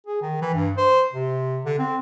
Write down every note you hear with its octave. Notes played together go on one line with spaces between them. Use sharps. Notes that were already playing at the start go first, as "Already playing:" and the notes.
G#4
D#3
E3
G2
C5
C3
D3
C4